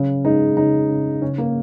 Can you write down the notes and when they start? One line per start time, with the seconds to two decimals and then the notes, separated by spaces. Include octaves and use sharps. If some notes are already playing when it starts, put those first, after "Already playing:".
Already playing: C#3 F#3
0.25 G#3 D#4
0.57 C#3 D#4
0.89 C#3
1.22 C#3 C#4
1.38 A#3